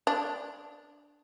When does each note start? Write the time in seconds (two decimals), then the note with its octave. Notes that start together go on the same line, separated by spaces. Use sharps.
0.07 D4